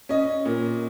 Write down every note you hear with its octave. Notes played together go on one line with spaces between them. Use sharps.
C#4 D#5
A#2